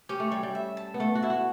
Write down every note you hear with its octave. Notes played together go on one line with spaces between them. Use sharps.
C#4 G4
A3
G3 C#5
G3
E5
A5
B3
A3 A4
F#4
E4 E5
F#4